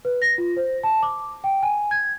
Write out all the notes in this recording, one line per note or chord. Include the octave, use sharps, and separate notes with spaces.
B4
A#6
F4
C5
A5
D6
G5
G#5
G#6